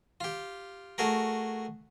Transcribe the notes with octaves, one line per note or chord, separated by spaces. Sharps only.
F4 G4
A3 F#4 G#4 A#4